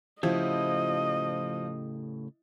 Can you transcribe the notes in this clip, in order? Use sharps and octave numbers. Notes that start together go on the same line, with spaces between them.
A2 C#3 F3 E4 G4 D#5